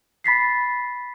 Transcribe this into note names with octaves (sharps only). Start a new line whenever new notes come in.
B5 A6 B6 C7